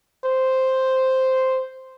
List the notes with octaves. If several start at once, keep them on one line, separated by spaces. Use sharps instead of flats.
C5